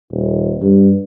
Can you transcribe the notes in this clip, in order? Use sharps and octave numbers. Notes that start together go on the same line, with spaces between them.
D#1
G2